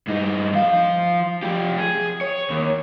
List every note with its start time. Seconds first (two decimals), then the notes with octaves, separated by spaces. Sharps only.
0.07 G2 D#4
0.54 F3 F5
1.42 F3 G4
1.78 G#4
2.21 C#5
2.50 D#2